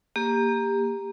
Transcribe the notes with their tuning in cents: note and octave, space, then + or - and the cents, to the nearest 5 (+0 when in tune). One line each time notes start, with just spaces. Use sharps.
A#3 +0 G4 +20